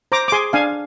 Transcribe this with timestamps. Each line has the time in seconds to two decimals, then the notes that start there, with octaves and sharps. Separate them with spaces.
0.12 C5 A#5 D6
0.28 D6
0.32 G#4 G#5 C6
0.53 D4 F5 G#5